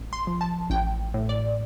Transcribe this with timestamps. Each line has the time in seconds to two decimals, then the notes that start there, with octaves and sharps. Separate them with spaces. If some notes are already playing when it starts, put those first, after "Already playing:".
Already playing: A1
0.13 C6
0.27 F3
0.41 A5
0.70 A1 G5
1.14 A2
1.29 D5